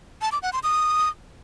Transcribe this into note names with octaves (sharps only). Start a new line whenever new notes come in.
A5
D6
F#5
C6
D#6